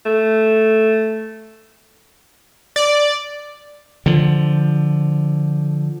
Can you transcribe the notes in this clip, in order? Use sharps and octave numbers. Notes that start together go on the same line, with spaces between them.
A3
D5
D3 F3